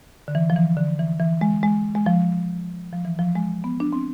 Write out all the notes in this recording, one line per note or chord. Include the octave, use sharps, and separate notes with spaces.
D3
E3
F3
E3
D3
E3
E3
G#3
G#3
G#3
F3
F3
E3
F3
G#3
B3
D4
C4